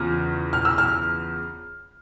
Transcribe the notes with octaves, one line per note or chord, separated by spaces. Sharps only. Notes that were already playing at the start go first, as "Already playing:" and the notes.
Already playing: E2 C#3 F3 F6
F6
E6
F6